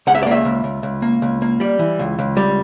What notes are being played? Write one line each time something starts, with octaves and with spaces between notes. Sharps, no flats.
C#2 F#5
E5
D5
A#3 E5
C#2
C#2
C#2
A#3
C#2
A#3
G3 D5
E3
C#2
C#2
G3